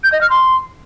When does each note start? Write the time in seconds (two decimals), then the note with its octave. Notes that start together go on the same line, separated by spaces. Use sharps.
0.04 G6
0.12 D#5
0.21 F6
0.30 C6